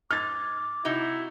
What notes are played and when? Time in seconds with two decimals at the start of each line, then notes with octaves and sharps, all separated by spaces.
0.11 G#2 D6 F6 G#6 A6
0.85 C3 D#4 E4 F#4